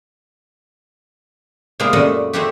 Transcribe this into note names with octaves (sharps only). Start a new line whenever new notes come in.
C3 G#3 A#3 B3 E4 F4
F#2 A#2 A3 D5 D#5 F#5
G#3 A3 C4 E4 F#4 G4